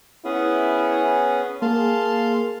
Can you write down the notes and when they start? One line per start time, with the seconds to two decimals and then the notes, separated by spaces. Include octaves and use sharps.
0.25 B3 C#4 E4 G#4
1.62 A#3 G#4 F5 A5 C6